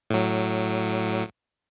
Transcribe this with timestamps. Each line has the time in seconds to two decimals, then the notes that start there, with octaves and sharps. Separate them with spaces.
0.10 A2 F#3